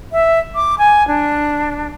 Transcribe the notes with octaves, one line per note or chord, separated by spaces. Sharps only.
E5
D6
G#5
D4